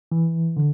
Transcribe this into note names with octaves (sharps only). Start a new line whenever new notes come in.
E3
D3